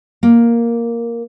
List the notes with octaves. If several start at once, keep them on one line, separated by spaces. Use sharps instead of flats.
A#3